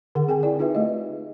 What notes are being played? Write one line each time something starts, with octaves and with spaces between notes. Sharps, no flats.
D3 G#4 A#4 F#5
C4 G#4 G5 G#5
E4 G#4 D5
D#4 F4 G#4 B4 E5
A3 G4 D#5